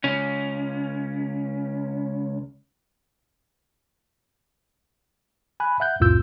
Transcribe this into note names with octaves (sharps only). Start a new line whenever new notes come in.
C#2 C#4
G#5 B5 F#6
E5 F#5 F#6 G6
C2 F2 A2 F4 E6 G6